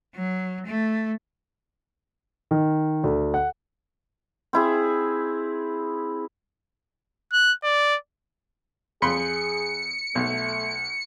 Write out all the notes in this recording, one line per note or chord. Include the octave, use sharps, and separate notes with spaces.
F#3
A3
D#3
D2
F#5
C4 E4 G#4
F#6
D5
F2 G#4 B5 C6 C#7
B1 A3